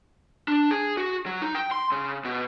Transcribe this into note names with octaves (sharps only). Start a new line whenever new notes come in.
D4
G#4
F#4
F#3
D#4
G5
C6
C#3
B2